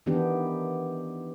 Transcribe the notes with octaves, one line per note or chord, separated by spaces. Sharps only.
D#3 E3 B3 D4 G4